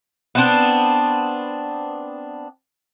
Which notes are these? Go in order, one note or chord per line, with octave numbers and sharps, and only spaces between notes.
B3 C4 D4